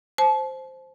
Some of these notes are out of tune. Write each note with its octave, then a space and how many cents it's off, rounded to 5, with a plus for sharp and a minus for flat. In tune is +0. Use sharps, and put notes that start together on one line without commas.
C5 +0 A5 -35